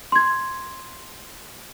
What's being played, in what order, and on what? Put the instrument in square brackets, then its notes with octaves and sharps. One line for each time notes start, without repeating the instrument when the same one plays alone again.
[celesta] C6 G#6